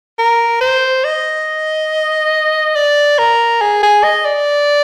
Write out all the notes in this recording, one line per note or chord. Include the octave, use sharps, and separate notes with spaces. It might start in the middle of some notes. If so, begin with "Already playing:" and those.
A#4
C5
D#5
D5
A#4
G#4
G#4
D#5
D5